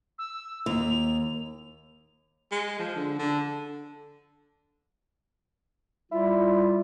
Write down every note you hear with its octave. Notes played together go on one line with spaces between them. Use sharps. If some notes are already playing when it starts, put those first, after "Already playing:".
E6
D#2 F7
G#3
F3
D3
D3
G3 E4 F4